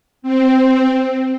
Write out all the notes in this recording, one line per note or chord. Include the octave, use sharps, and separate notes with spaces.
C4